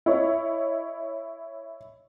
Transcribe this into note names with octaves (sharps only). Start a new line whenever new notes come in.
E4 C#5 D#5